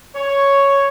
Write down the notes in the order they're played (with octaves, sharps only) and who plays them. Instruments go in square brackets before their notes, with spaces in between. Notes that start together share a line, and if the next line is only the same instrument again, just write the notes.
[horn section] C#5